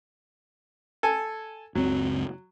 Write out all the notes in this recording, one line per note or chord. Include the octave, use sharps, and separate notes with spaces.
A4 G#5
F#1 C#2 F#3 C4